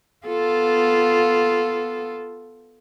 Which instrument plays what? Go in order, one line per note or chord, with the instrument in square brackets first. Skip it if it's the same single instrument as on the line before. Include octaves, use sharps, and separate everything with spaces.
[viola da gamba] B3 F4 A4